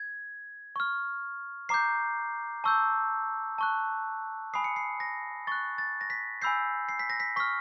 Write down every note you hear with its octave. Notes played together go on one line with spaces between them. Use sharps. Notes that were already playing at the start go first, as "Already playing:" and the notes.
Already playing: G#6
C#6 F6
A#5 D6 G6 C7
A5 C#6 E6 G6
A5 C#6 F#6
G#5 B5 D#6 C7
C#7
C7
A#6
C#6 F#6 A6
A6
A#6
B6
G#5 B5 E6 G6 C7
C7
B6
A#6
B6
C#6 F6 B6